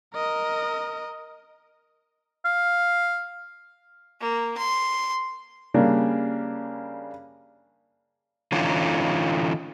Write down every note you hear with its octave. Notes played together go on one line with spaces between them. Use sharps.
A#4 D#5
F5
A#3
C6
C#3 G3 A#3 C#4 D4
D3 E3 C#4 D#4 F4